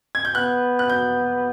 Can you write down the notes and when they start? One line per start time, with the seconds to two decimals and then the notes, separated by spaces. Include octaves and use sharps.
0.15 G#6
0.25 G6
0.35 B3 F#6
0.79 F#6
0.90 G6